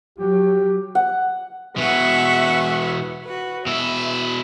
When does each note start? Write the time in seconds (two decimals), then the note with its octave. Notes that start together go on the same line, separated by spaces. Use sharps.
0.18 F#3 G4
0.95 F#5
1.78 B2 E3 E5 F#5 C#6
3.24 F#4 B4
3.66 B2 E4 E5